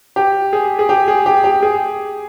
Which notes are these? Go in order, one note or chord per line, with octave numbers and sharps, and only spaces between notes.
G4
G#4
G#4
G4
G#4
G4
G4
G#4